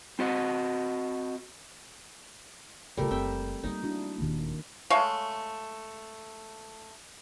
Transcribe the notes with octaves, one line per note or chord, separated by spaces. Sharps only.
C4 F#4 D#5
C#3 G3 A3 F4 A#4
F#1 C4 E5 G5
G3 A#3 D#4
D4 E4 F#4
D#1 D#2 D#3 A#3
G#3 A3 C#5 F5